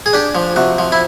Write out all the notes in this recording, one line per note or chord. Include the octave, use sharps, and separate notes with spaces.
G#4
D4 G4
F3
C3 F#4
F3
E4